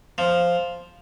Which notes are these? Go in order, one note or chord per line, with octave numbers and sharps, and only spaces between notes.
F3